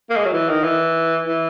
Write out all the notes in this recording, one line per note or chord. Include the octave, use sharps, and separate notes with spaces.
A#3
G#3
F#3
E3
D#3
E3
E3